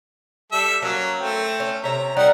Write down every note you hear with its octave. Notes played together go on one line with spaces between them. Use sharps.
G3 A4 E5
F#3 A#3 C#4
A3 C4
C#4
C3 C#4 E5 A#5
G3 D#4 A#4 F#5